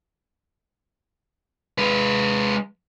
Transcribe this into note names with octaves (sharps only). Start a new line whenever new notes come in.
G#3 B4